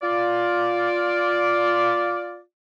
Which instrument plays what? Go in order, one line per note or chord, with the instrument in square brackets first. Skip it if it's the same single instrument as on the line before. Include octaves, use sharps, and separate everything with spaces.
[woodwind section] F4 D5